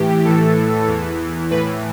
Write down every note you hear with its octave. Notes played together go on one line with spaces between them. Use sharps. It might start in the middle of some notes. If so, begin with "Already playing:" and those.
Already playing: A2 E3 G4
A2 E3 A4
E2 E3
A2 E3 B4